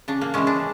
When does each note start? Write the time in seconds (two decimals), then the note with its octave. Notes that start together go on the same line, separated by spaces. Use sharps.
0.08 C#3 D4
0.21 A#3
0.34 E3 G#3 C#4
0.47 D4